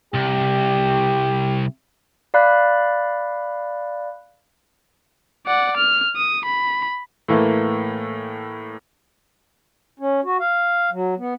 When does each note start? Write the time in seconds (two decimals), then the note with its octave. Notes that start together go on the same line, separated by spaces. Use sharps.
0.14 C2 G4
2.34 D5 F5 B5 F#6
5.46 D5 F#5
5.77 F6
6.16 D#6
6.45 B5
7.28 A2 E3 A3 A#3
9.99 C#4
10.24 F#4
10.40 F5
10.91 F#3
11.18 B3